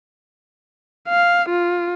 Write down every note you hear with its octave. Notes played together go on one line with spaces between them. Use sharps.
F5
F4